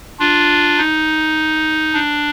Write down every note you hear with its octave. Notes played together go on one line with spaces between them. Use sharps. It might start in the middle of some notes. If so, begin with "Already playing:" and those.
D4 F4
D#4
D4